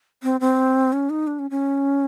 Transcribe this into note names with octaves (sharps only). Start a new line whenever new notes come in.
C4
C4
C#4
D#4
D4
C#4
C#4